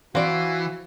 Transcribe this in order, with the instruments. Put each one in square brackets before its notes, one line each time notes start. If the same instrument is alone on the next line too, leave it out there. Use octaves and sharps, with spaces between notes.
[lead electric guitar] E3 [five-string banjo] C4 D5 [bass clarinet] F#4 [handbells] F5